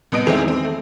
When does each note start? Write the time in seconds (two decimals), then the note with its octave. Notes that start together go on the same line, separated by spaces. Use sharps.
0.12 C2 B3 D#5 D7
0.26 E2 D#3 E3 G#3 C4 E4
0.48 C4
0.64 A3